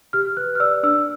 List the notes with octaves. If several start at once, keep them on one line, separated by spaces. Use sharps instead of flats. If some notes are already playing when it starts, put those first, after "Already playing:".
G4 F6
B4 F#6
F6
D5 E6
D4 E6